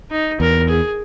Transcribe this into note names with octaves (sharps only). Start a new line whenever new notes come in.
D#4
E2 A#4
G#4